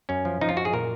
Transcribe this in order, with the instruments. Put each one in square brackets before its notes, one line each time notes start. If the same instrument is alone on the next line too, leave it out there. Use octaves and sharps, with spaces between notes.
[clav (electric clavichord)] F#2 C#4
F3
F3 D#4
F4
F#2 F#4
G#4
A#2 A#4